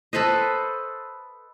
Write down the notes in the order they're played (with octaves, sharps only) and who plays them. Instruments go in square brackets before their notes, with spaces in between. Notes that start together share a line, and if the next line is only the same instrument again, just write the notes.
[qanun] A4 B4 C5 D#5